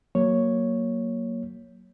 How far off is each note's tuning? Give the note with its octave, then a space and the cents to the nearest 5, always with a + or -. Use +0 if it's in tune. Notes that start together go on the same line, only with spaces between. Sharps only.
F#3 +0 A#3 +0 C#5 +0